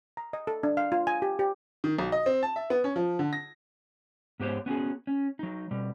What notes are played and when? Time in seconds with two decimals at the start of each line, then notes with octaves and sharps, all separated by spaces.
0.17 A#5
0.33 D#5
0.47 A4
0.63 D4
0.77 F5
0.92 F4
1.07 G#5
1.22 G4
1.39 G4
1.84 D#3
1.99 B1
2.12 D#5
2.26 C4
2.43 A5
2.56 E5
2.70 B3
2.84 C#4
2.96 F3
3.19 D3
3.33 A#6
4.40 G#2 B3 G4 C5 C#5
4.66 B3 C#4 F#4 G#4
5.07 C#4
5.39 F#3 D#4
5.71 B2 G3